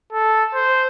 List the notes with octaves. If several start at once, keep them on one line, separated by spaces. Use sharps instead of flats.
A4
C5